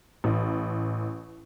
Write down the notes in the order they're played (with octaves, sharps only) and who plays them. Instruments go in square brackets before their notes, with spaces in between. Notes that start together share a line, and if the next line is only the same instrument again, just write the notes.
[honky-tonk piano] A1